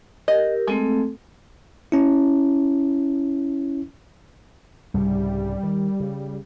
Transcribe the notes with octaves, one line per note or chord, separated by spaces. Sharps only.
G4 A#4 D#5
G#3 A3 C4 A4
C#4 E4
C2 G#2 C#3 G3
D#3
C#3